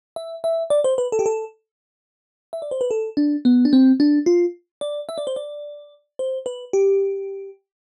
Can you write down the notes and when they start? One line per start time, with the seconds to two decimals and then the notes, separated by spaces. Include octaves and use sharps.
0.16 E5
0.44 E5
0.70 D5
0.84 C5
0.98 B4
1.12 A4
1.19 G4
1.26 A4
2.53 E5
2.62 D5
2.71 C5
2.81 B4
2.91 A4
3.17 D4
3.45 B3
3.65 D4
3.73 C4
4.00 D4
4.26 F4
4.81 D5
5.09 E5
5.18 D5
5.27 C5
5.36 D5
6.19 C5
6.46 B4
6.73 G4